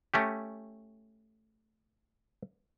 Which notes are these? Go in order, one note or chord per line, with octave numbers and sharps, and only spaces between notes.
A3 C#4 G4